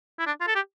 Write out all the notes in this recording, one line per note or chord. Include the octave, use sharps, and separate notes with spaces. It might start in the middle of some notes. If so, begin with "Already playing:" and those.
E4
D4
F4
A4
G4